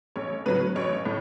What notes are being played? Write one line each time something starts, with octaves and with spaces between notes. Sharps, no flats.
A1 C#5
A2 F#3 B4
A1 C#5
A2